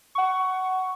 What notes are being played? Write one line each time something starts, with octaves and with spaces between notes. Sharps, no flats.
F#5 C#6